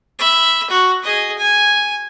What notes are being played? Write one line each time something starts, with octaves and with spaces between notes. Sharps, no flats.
E5 B5
F#4
G#4 D#5
G#5